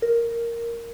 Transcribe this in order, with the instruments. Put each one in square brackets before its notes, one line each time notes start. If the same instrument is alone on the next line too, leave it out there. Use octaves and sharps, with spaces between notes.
[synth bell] A#4